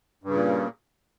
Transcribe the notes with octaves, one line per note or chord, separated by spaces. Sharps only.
G2 A#2 C#3